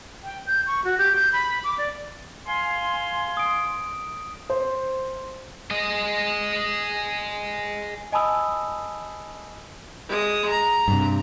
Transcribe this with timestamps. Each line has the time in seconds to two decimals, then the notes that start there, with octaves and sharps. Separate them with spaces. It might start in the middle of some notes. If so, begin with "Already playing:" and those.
0.23 G5
0.47 G6
0.67 C#6
0.85 F#4
0.98 G4
1.16 G6
1.33 B5
1.64 D6
1.78 D5
2.46 F5 G#5 C6
3.37 D#6 D7
4.50 C5
5.71 G#4 D#5
8.12 D#5 G#5 A5 B5 D#6 E6
10.08 G#3 D#6
10.48 A#5
10.88 G2 C3